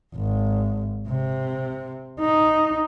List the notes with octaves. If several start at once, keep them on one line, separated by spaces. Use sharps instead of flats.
G#1
C3
D#4